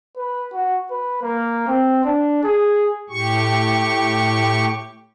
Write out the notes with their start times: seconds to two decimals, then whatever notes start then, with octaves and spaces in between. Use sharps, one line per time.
0.16 B4
0.53 F#4
0.91 B4
1.22 A#3
1.68 C4
2.04 D4
2.44 G#4
3.10 A2 G4 C#6